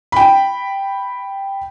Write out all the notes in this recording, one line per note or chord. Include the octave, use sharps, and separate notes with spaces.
G5 B5